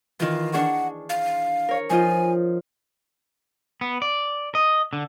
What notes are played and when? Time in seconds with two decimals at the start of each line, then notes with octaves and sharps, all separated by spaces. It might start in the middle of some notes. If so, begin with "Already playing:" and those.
0.20 D#3 E3 F4
0.53 D4 G#4 F#5 C#6
1.09 F5
1.69 A#4 C#5
1.90 F3 D#4 F4 G#5
3.81 B3
4.02 D5
4.55 D#5
4.93 D3